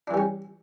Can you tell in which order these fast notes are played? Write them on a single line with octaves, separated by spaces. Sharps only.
D4 E3 G3 C#4